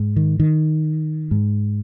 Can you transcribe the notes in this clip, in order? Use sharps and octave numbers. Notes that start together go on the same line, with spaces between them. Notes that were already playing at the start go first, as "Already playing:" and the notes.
Already playing: G#2
D#3
D#3
G#2